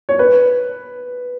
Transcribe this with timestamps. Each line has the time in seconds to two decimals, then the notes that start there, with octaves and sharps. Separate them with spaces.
0.09 C#5
0.19 B4